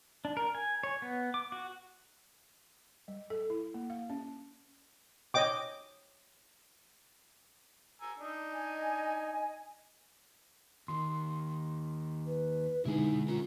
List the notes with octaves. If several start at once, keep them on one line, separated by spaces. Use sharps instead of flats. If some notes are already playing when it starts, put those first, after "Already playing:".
D4
A#4
G#5
C#5
B3
D6
F#4
G3
A4
E4
A#3
F5
C#4
C#5 D#5 G5 D6
G#5 A#5 E6
D4 D#4
D#5 G#5
D#2 D#3 C6
B4
B2 D3 G#3 D#4 E4 G#4
C#4 F4 A#4